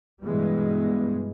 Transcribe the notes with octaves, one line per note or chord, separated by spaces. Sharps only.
G2 B2 E3 G3 G#3 B3